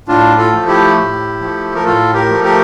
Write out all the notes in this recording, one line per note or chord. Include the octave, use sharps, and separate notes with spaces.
A2 D4 F4
F4 A4
F3 A3
E4 G4
A2
F3 A3
A#4
A2 F4 A4
G4 A#4
F3 A3
G4 A#4